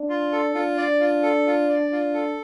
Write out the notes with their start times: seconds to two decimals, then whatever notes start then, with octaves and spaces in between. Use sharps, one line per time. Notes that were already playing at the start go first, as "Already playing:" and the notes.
Already playing: D4
0.09 F4
0.32 A4
0.55 D4 F4
0.78 D5
1.00 F4
1.23 A4
1.47 F4
1.69 D5
1.92 F4
2.14 A4